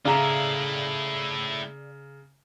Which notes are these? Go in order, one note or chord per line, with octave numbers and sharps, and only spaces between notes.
C#3 A3 E4 D5 F5 A#5